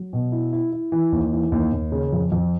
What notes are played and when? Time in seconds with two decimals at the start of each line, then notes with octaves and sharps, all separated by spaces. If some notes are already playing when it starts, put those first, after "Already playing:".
Already playing: F#3
0.13 B2
0.32 E4
0.53 E4
0.72 E4
0.92 E3
1.12 D#2
1.33 E3
1.52 D#2
1.73 D#2
1.92 C#3
2.13 F2
2.32 F2